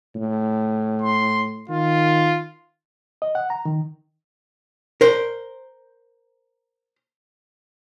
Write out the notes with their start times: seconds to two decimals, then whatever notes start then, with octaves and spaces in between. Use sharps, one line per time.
0.15 A2
1.02 C6
1.69 D#3 F4
3.22 D#5
3.35 F#5
3.50 A#5
3.65 D#3
5.01 A#4 C5